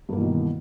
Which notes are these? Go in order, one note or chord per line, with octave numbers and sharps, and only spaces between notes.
G2 B2 D#3 E3 A#3